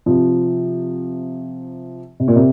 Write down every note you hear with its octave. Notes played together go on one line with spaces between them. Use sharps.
C3 F3
C3
A#2
C3